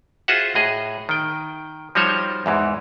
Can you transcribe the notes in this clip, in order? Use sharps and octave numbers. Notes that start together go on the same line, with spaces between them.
F4 F#4 G#4 C5 E5 F#5
A2 G#4 D#5
D#3 G5
F3 G3 D#4 F#4 C5 C#5
E2 G#2 E3